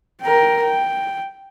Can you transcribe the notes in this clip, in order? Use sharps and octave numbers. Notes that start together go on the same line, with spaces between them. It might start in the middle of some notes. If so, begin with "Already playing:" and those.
A#4 G5
G5